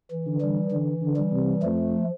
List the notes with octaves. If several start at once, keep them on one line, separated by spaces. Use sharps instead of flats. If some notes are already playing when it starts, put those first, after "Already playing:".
E3
D3
E3 G3
D3 E3
D3
E3 G3
C3
F2 F3 A3